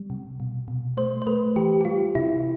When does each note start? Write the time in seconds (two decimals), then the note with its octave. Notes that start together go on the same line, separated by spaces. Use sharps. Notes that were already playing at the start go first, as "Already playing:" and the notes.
Already playing: G3
0.10 C3
0.40 B2
0.68 B2
0.97 A3 C5
1.22 C5
1.27 A3 B4
1.56 E3 G4
1.81 G4
1.85 G3 F4
2.15 C3 E4